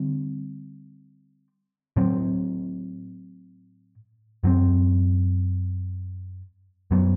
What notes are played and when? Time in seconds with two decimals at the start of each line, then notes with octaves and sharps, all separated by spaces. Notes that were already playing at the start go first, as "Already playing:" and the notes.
Already playing: D3 G3 C4
1.97 A2 F#3 C4
4.44 F#2 F#3 C4
6.91 F#2 F#3 B3